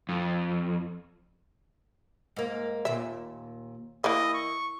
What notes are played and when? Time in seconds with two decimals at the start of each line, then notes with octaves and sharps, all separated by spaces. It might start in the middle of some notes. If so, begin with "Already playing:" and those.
0.09 F2
2.36 G#2 A#3
2.85 D#2 A#2 E5
4.04 E3 A#3 E4 D#5
4.34 C#6